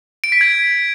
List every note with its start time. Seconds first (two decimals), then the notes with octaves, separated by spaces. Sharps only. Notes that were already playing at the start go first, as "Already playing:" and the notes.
0.24 D7
0.32 B6
0.41 G#6